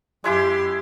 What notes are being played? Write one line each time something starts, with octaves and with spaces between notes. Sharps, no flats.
F#2 G#3 E4 G4 G#4 C6